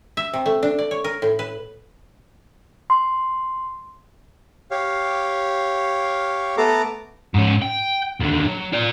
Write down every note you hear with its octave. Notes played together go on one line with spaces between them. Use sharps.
E5
C3
A3
D4
D5
C#5
A#4
A2
B4
C6
G4 C#5 F5
A3 B3 A4 A#5 D6
G#2 C#4
G5
D#2 D3
F#3
F4 D5